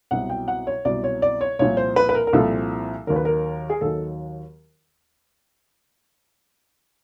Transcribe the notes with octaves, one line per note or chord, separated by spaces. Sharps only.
C2 B2 F#3 F#5
G5
F#5
C#5
C2 B2 F#3 D5
C#5
D5
C#5
C2 A#2 F3 C#5
C5
B4
B4
A#4
A#4
C2 A#2 F3 A4
D#2 D#3 F#3 A#4
B4
A#4
G#4
D#2 D#3 F#3 A4